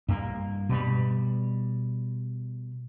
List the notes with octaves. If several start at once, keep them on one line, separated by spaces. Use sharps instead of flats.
G2 A#3
B2 G3